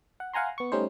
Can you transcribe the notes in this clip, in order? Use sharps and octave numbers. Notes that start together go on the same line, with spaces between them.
F#5
F5 F#5 G#5 A#5 C6
B3 C#6
G3 A3 C#4 D#4 C5